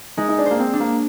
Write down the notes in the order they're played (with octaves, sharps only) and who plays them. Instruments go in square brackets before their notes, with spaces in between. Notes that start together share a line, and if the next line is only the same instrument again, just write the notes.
[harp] G#3 [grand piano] D#4
[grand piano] D#4
D4
[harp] C5
[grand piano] A#3
C4
[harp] D4
[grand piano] A#3